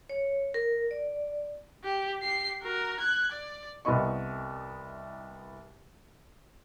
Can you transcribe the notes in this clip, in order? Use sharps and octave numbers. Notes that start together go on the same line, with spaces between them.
C#5
A#4
D5
G4
G4 C7
F#4 A#4
F#6 G#6
D5
C2 B3 C4 E4 D#5 C#6